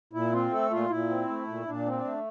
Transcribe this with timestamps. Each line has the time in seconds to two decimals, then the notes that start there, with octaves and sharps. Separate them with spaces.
0.13 A#2 E4
0.32 C4 F4
0.52 A3 A4
0.71 A#2 F4
0.90 A#2 E4
1.09 C4
1.28 A3
1.47 A#2
1.66 A#2 D4
1.86 C4
1.92 D4
2.05 A3